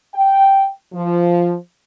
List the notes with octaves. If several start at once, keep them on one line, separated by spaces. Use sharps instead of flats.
G5
F3